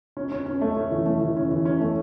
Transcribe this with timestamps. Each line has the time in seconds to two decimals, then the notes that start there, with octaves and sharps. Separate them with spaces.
0.17 C#4
0.32 C#4
0.46 C#4
0.61 A3
0.77 C#4
0.91 E3
1.06 A3
1.21 E3
1.36 C#4
1.51 E3
1.65 C#4
1.81 A3